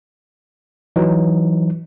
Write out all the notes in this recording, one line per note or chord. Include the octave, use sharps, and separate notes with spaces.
E3 F#3 D#4